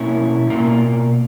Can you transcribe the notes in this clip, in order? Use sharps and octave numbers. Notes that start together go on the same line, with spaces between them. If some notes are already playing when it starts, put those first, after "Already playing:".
Already playing: B2 A#3 C#4 E4
B2 A#3